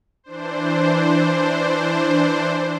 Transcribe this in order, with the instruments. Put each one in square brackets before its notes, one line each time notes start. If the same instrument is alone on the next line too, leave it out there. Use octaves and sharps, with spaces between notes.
[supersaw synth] E3 D4 C5